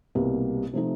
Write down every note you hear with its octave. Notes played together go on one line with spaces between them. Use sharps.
C2 B2 G3 A#3
C3 F3 A3 C4 D#4